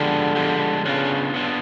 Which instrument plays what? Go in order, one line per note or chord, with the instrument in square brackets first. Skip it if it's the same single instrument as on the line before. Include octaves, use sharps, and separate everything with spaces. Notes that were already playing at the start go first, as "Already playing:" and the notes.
Already playing: [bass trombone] D3 [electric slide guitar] F3 G#3 B3 D4 G4
[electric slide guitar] F3 G#3 B3 D4 G4
[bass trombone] C#3 [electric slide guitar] B3 D4 F4
[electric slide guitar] B3 D4 F4